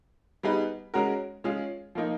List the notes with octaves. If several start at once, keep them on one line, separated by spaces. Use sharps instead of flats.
G3 B3 D#4 G#4 B4
G#3 C#4 F#4 A#4
G#3 C#4 F4 G#4
F3 A#3 D#4